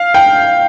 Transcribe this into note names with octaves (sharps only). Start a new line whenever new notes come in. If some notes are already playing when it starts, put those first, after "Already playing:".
Already playing: F5
G5